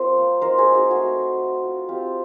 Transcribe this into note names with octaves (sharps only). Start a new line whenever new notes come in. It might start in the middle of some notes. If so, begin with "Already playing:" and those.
Already playing: G3 C4 F4 A#4 C5
A#3
D#4 A#4 C5
G#4 A#4
D#4
F#4 G#4
A3 F#4 G#4
A3
A3
F4
C4 F4 G4